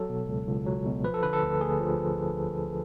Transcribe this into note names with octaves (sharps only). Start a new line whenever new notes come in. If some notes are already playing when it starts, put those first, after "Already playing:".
Already playing: F#3 A4
B2
C#2
C#2
F#3
B2
F3 B4
A4
D3 B4
A4
D2
D2 G#4
F3